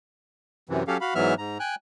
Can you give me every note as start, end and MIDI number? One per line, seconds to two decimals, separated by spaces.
0.69 0.83 42
0.69 0.83 48
0.69 0.83 52
0.88 0.97 54
0.88 0.97 61
0.88 0.97 67
0.88 0.97 69
0.88 0.97 77
1.01 1.14 66
1.01 1.14 77
1.01 1.14 83
1.15 1.34 44
1.15 1.34 52
1.15 1.34 54
1.15 1.34 59
1.15 1.34 76
1.15 1.34 89
1.38 1.58 44
1.38 1.58 82
1.60 1.75 79
1.60 1.75 80
1.60 1.75 90